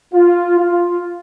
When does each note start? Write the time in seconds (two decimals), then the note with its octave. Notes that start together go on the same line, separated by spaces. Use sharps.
0.14 F4
0.59 F4